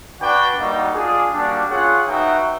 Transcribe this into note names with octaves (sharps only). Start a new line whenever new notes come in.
D4 F#4 B4 D5 G5
G3 A#3 D#4 F#4
D4 F4 G#4
G3 A#3 D4 F#4
C#4 F4 G#4 C#5 F#5
D#4 F#4 B4 E5 G5